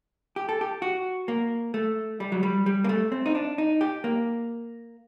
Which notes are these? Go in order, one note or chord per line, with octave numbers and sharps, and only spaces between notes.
G4
A4
G4
F#4
A#3
A3
G3
F#3
G3
G3
A#3
A3
C4
D#4
D4
D#4
G4
A#3